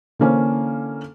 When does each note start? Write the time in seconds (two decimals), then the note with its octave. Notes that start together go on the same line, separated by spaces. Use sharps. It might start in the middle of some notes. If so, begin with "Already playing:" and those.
0.19 D3 E3 A#3 C#4 A4 C5